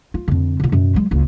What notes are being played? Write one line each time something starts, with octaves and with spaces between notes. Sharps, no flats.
F4
F2 D3
A#2 D3
F#2 B2
F#3 G#3
F#1 C#2